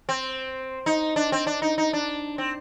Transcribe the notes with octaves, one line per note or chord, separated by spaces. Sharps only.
C4
D#4
D4
C4
D4
D#4
D#4
D4
C4